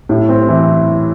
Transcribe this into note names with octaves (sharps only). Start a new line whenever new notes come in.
A2
C4
E3